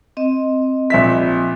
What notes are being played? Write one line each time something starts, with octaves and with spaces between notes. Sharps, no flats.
C4 D#5
A#1 E5 B6